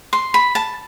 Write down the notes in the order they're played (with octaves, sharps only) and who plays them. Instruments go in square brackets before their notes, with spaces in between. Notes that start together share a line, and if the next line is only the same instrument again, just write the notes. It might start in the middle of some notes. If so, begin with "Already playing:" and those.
[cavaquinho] C6
B5
A5